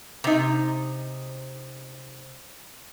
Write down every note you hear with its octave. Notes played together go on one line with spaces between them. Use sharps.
C3 D#4